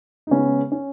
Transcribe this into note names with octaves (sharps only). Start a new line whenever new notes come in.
D#4
C#3 G#3 B3 C#4
C#4